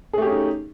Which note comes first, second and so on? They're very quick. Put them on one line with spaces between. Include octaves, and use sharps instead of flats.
G#4 A3 G4 C#4 D#4